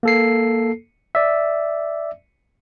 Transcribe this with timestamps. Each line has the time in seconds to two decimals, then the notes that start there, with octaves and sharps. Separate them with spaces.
0.03 A#3 A4 C7
1.15 D5 E5